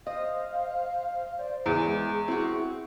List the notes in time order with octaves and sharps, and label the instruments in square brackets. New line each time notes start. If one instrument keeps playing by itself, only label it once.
[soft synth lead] C5 [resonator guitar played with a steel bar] D#5 [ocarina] F5
[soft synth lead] C5 [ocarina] D5
[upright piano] E2 [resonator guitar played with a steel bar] E3 [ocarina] G#4
[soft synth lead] G#3
[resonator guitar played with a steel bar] C4 F#4 [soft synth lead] E4